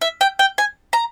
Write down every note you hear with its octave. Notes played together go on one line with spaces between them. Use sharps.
E5
G5
G5
G#5
A#5